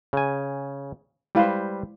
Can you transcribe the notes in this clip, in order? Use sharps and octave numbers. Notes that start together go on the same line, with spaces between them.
C#3 G#5
G3 G#3 E4 B4 C5 F5